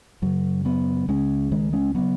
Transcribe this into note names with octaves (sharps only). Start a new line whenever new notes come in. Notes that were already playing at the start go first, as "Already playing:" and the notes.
F#2 C#3 F#3
F#3 B3
C#2 C#3 G#3 C#4
D#3 G#3
G#3 C#4
C#3 F#3 B3